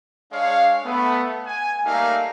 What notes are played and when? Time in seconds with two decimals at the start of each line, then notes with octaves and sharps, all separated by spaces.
0.32 G#3 D4 C#5 F5
0.85 A3 B3
1.46 G#5
1.86 G3 A3 A#3 D#4 A#4 F5